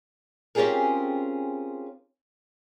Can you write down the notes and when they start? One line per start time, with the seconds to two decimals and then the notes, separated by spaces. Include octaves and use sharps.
0.55 C4 C#4 F4 G4 G#4 A#4